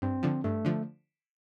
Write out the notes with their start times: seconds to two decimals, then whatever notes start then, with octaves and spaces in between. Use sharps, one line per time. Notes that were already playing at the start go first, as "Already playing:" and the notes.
0.02 G2 C4
0.23 D3 F3
0.44 G2 A3
0.65 D3 F3